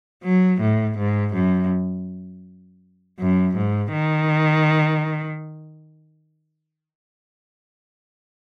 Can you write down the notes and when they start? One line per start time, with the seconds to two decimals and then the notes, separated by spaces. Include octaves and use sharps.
0.24 F#3
0.61 A2
0.98 G#2
1.34 F#2
3.19 F#2
3.56 G#2
3.93 D#3